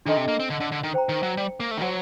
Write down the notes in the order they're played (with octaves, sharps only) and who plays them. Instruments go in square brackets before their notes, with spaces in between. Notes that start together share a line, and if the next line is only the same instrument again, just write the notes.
[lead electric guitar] D#3 [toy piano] D4 A4 D#5 A5 C6
[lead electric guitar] C3
A#3
C4
D3
D3
D3
D#3
[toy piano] C5 G5 A#5
[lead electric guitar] D#3
F#3
G3
A#3
A3
D#3
[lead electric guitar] F#3 [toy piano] F#4 C5 F#5 A5